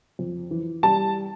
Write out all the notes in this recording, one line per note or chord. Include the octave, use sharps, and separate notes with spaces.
F2
E3
G3 A5